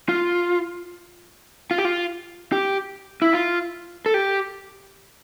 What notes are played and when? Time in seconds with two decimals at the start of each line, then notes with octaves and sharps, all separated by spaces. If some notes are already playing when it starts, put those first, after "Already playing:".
0.09 F4
1.71 F4
1.78 G4
1.85 F4
2.52 G4
3.22 E4
3.33 F4
4.06 A4
4.14 G4